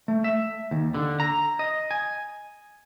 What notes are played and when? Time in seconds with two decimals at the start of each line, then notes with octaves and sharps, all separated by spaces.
0.08 A3
0.24 E5
0.71 D#2
0.94 D3
1.20 A#5
1.59 D#5
1.91 G#5